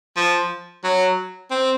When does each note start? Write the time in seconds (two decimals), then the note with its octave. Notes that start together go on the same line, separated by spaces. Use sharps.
0.17 F3
0.84 F#3
1.51 C4